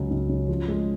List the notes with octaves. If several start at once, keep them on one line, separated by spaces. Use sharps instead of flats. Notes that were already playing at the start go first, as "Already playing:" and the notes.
Already playing: C#2 F#3
C#2
C#3
F3
G#3